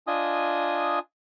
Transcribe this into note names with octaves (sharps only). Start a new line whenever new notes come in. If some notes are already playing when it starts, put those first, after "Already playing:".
D4 F4 D#5 G#5 D#6